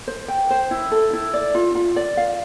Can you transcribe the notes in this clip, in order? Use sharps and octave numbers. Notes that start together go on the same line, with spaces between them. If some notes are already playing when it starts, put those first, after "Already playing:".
C5
G5
C5
E4
A4
E4
D5
F4
F4
D5
F5